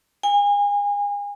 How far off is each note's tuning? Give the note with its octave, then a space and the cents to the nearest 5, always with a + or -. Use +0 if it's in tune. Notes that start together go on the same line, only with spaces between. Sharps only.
G#5 -35